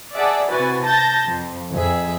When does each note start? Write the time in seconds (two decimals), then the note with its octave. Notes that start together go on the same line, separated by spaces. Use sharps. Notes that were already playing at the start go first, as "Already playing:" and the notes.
0.16 G#4 D5 E5 F#5 A5
0.51 C3 E3 F#4 B4 G#5 A6
0.86 A5 G6 A6 A#6
1.24 F2
1.72 F2 G#4 E5